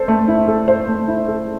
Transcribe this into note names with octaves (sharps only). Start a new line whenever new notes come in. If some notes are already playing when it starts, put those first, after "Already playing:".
Already playing: A4 C5
A3
E4
A4
C5
A3
E4
A4